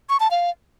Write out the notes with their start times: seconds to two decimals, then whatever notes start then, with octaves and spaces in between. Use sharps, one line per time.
0.09 C#6
0.20 A5
0.31 F5